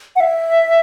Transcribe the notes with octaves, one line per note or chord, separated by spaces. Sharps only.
F#5
E5